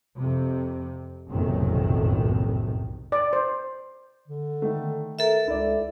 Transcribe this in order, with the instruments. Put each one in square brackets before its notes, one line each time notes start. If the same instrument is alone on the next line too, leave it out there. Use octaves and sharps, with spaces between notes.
[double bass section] F2 C3
F#1 B1 F2 A2 C3 D#3
[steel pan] D5
C5
[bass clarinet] D3
[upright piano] D#3 A3
[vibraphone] A4 E5 [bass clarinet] A#4
[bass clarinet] C#2 [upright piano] E4 D5